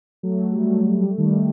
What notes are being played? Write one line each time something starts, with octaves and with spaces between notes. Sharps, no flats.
F#3 A3
A3
G3
F#3 A3
G3
A3
D#3 G3
A3